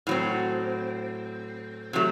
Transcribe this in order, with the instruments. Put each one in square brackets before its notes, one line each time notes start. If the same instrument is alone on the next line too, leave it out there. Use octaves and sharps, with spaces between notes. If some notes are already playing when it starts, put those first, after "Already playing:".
[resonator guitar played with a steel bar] A2 F#3 C4
C3 F#3 A3